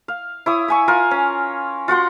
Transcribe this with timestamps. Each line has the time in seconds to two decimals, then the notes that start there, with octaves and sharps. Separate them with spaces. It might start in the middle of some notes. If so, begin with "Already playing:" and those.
0.08 F5
0.46 E4 C#5 D#6
0.68 E5 G#5 C#6
0.88 F4 A#4 F5 G#5
1.11 C#4
1.88 F4 F#4 F#5 C6